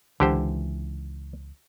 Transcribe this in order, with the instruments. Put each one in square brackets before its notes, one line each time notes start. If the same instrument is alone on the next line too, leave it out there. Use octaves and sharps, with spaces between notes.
[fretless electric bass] C#2 E3 [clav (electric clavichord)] D3 G4 C5